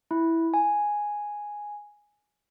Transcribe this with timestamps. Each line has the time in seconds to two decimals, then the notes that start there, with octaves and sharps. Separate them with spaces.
0.11 E4
0.54 G#5